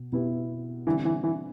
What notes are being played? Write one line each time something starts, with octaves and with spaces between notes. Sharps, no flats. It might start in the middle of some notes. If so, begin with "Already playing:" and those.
Already playing: B2
B2 B3 E4 G4 B4
D3 E3 G3 C4
E3
E3